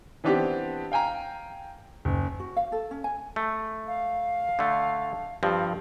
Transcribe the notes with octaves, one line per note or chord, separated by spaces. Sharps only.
E3 B3 C4 D4 G4
F5 G5 G#5 A#5
F#1
F#4
F5
A4
C#4
G#5
A3
F5
D3 A3
G2 F3 C4